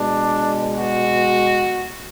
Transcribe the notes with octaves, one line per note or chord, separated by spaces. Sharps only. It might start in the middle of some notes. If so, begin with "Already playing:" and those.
Already playing: B2 G#3 D4
F#4